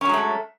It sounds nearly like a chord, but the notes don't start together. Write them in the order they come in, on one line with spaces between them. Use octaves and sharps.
C#4 F#3 G#3 A3